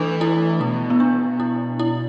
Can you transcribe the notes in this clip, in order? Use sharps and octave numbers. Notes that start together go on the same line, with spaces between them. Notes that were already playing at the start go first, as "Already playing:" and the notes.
Already playing: E3 A3 D4 E4 A4 B4
E4
B2 E4
B3
D4
E4
E4